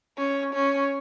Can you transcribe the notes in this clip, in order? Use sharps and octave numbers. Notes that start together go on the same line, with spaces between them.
C#4
C#4